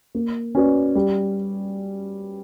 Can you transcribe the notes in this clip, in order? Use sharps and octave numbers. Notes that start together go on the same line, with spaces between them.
A#3
C#4 F#4 B4 D5
G3